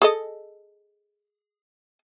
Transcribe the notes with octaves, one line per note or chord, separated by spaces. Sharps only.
G#4 A4 D#5